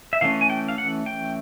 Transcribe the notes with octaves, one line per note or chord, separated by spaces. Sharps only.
E5
E3 A3 C#4 F5
G#5
G5
F5
F#5
G5